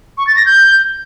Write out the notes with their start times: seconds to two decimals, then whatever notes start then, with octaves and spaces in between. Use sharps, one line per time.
0.18 C#6
0.27 A6
0.36 A#6
0.46 G6